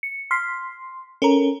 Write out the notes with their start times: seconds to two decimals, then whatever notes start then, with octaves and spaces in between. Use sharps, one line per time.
0.03 C#7
0.31 C6 F6 B6 C7
1.22 C#4 A4 A#4 A#5